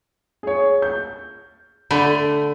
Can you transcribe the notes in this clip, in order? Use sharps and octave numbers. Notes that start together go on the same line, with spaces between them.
G#4 C#5
G6
D3 A3 B5